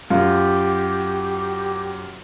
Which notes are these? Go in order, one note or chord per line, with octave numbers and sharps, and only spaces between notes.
F#2 F4 G4